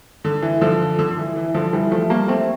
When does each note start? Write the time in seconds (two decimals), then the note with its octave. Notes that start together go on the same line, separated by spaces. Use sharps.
0.25 D3
0.42 E3
0.61 D3 F3
0.99 D3
1.11 D3
1.18 E3
1.36 E3
1.54 D3 F3
1.73 E3 G3
1.91 F3 A3
2.10 G3 A#3
2.28 A3 C4